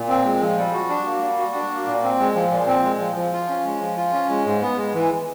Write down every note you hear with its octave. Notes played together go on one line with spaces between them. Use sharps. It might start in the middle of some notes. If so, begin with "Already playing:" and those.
Already playing: A#2
C4
G#3
F3
G3
F#4
D4
A#3
G3
F#4
D4
A#3
A#2
C4
G#3
F3
A#2
C4
G#3
F3
F3
F4
C#4
G#3
F3
F4
C#4
G#3
G#2
B3
G#3
E3